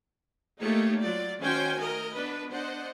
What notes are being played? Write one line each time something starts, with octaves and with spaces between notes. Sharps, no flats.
A3 A#3 D#4 G4 C#5
F#3 F4 D5
D#3 C#4 F#4 C5 G5 G#5
A3 A#4 D#5
B3 D4 B4
D4 C5 D#5 F#5